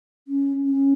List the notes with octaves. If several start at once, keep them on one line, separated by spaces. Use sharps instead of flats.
C#4
C#4